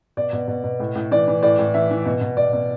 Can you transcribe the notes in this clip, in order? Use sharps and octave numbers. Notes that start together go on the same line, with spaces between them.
B2 D5
B2
B2
B2
A2
A2
E3 D5
E3
A2 D5
A2
E3 E5
E3
B2
B2
B2 D5
B2